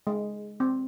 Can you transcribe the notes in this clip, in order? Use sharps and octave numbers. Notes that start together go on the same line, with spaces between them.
G#3
C4